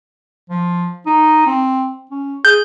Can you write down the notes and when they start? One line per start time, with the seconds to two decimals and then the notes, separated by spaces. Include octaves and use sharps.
0.50 F3
1.06 D#4
1.46 C4
2.11 C#4
2.45 G#4 G6